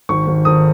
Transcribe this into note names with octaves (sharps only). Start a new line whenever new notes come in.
G#1 C#6
G#1
G#1 D#6